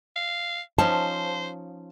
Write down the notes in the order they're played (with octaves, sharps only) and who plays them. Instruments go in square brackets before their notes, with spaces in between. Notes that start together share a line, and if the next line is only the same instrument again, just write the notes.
[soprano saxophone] F5
[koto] F3 C#4 D#4 [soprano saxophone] C5 [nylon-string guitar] A5